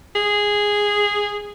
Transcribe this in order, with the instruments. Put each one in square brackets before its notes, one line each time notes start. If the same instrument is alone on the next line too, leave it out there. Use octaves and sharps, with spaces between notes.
[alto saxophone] G#4